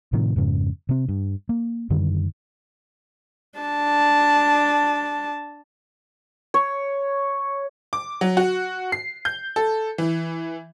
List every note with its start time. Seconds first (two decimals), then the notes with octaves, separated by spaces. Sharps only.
0.13 A2 C3 D#3 F3
0.36 F2 G#2 C#3
0.89 C3 C4
1.09 G2
1.49 A#3
1.90 F#2 D3 D#3 G3
3.60 D4 A5
6.54 C#5
7.93 D6
8.21 F#3
8.37 F#4
8.92 C7
9.25 G6
9.56 A4
9.98 E3